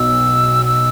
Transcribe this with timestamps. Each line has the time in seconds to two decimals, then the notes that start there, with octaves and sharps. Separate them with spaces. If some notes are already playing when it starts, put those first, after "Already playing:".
Already playing: B1 E6
0.66 E6